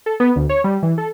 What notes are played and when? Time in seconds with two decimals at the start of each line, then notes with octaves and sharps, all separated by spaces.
0.06 A4
0.20 B3
0.36 D2
0.49 C#5
0.64 G3
0.83 E3
0.98 A4